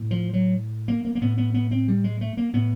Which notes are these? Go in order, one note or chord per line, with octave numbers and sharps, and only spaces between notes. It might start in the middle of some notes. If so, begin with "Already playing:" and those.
Already playing: A2
F3
F#3
A#3
A#3
A#3
A2 B3
B3
B3
C4
G3
G#3
A3
A#3
A2 B3